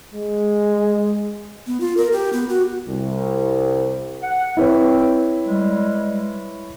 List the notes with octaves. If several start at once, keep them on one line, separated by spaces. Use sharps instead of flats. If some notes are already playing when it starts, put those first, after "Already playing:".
G#3
B3
F4
A#4
G4
B3
F#4
C2
F#5
C4 E4 B4 C#5
G3 G#3